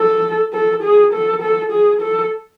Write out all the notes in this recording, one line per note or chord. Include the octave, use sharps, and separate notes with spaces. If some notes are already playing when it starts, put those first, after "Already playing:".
Already playing: A4
A4
G#4
A4
A4
G#4
A4